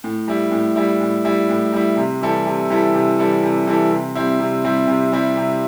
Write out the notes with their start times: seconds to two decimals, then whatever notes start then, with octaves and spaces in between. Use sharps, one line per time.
0.04 A2
0.28 G3 E4
0.52 A2
0.76 G3 E4
1.01 A2
1.25 G3 E4
1.49 A2
1.73 G3 E4
1.97 C3
2.21 E3 G3 E4 A4
2.46 C3
2.70 E3 G3 E4 A4
2.94 C3
3.19 E3 G3 E4 A4
3.43 C3
3.67 E3 G3 E4 A4
3.91 C3
4.15 G3 C4 E4
4.40 C3
4.64 G3 C4 E4
4.87 C3
5.12 G3 C4 E4
5.36 C3